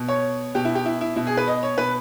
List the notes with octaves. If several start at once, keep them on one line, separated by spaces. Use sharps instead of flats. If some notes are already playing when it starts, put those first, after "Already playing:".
Already playing: B2
C#5
B2 G4
E4
G4
E4
E4
B2 E4
G#4
B4
D#5
C#5
B2 B4